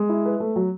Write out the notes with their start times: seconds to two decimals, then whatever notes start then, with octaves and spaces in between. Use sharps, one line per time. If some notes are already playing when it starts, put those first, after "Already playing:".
Already playing: G#3
0.09 E4
0.26 B4
0.40 A3
0.56 F#3